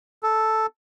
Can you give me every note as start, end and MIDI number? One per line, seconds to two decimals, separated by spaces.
0.23 0.66 69